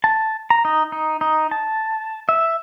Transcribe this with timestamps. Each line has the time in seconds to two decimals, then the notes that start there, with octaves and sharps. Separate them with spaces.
0.04 A5
0.50 A#5
0.65 D#4
0.92 D#4
1.21 D#4
1.51 A5
2.29 E5